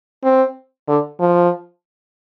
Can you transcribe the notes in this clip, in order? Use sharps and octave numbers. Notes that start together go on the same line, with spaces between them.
C4
D3
F3